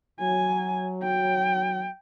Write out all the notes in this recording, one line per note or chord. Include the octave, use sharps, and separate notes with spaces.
F#3 G#5
G5